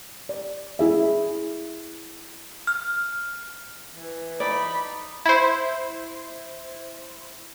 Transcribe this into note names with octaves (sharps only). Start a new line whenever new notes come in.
D5
E4 G#4 E5
F6
E3
D#4 D5 B5
E4 C5